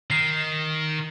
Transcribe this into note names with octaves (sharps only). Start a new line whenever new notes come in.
D#3 C7